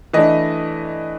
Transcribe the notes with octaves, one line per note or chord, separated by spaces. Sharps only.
E3 A3 D4 D#5